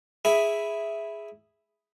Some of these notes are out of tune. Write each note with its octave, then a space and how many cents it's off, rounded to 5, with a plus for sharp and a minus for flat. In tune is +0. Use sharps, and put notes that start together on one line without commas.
E4 +0 G#4 +0